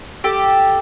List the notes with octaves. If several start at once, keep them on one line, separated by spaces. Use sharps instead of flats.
G4 A4